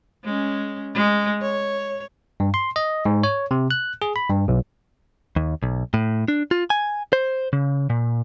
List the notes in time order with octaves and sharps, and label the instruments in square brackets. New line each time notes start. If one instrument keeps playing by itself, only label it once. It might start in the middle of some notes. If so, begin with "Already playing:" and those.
[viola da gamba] G#3 C#4
G#3
C#5
[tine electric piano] G2
C6
D#5
G#2
C#5
C3
F#6
G#4
B5
G2
B1
[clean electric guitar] D#2
B1
A2
D4
F4
G#5
C5
C#3
A#2